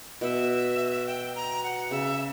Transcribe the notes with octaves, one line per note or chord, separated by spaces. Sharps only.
B2 E5
G5
A#5
F#5
C#3 E5